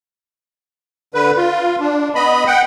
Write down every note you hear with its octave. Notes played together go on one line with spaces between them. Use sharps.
D3 B4
F4
D4
B3 D#5 B5
F#5 G5